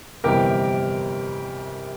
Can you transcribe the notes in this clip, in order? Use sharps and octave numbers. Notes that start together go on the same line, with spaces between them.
G1 F2 C3 E3 G3 G4 A#4